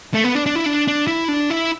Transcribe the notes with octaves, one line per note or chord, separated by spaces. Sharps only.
A3
B3
D4
D4
E4
D4
D4
E4
D4
E4